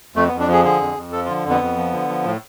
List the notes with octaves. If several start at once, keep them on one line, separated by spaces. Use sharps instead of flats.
F2 A3
B3
F2
D4
F3 G#4
D3 G#4
F2
F2
F3 A4
F4
D3
F2 B3
F2
F3
D3
F3
A2